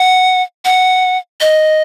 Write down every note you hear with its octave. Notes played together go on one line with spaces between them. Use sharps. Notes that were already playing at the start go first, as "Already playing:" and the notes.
Already playing: F#5
F#5
D#5